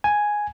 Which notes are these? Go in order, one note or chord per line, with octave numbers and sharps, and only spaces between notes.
G#5